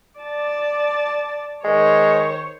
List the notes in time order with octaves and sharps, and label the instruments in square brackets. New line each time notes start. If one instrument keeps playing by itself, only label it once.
[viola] D5 A5
[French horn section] D#3 A#4 [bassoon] G#3 [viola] C5 C#5